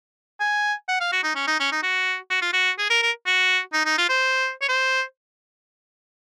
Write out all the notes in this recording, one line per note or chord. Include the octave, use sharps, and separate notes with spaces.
G#5
F#5
F5
F#4
D#4
C#4
D#4
C#4
D#4
F#4
F#4
F4
F#4
G#4
A#4
A#4
F#4
D#4
D#4
F4
C5
C#5
C5